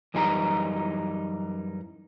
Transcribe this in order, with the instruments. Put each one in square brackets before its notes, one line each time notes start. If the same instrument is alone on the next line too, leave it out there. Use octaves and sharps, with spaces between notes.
[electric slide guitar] F#2 E3 G3 D#4 G#5 A#5